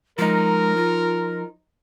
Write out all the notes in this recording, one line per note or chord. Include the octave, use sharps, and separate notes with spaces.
F3 G#3 D#4 A#4
F4